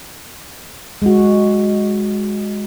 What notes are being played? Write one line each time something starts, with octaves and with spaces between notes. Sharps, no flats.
G#3 F#4